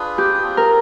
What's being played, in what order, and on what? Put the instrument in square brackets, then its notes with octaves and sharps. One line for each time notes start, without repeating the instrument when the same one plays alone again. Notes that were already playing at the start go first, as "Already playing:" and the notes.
Already playing: [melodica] D4 F4 G#4 B4
[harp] G4
[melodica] C4 F4 G#4
[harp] A#4